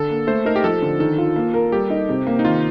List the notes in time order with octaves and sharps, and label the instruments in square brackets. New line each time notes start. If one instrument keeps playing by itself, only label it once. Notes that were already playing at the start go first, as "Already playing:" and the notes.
Already playing: [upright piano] D3 [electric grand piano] A4
[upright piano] A#3
[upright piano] A3 [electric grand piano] C5
[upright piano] D#4 [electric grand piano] A#4
[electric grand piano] G4
[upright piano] F3 [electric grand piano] A4
[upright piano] D3
[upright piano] D#3 [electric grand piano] A4
[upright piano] F4
A#3
A#4
[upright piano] G3 [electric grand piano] G4
[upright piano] D#4
C3
A#3
[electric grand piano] D#4
[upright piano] D#3 [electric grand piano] F4